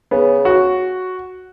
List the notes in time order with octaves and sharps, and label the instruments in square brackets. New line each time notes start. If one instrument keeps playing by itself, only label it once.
[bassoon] C#3 [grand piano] B3
[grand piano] F#4